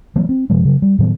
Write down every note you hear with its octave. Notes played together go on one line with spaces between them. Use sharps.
E3 F#3 A3 B3
C4
F#2 C3 F3 G#3
C#3 F#3
G3
A2 D#3 F#3 B3